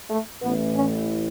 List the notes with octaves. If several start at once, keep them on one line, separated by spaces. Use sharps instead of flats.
A3
A1 A2 E3 B3
C#4